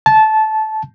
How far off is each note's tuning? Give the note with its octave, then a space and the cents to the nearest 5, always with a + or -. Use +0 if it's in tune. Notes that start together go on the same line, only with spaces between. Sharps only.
A5 -15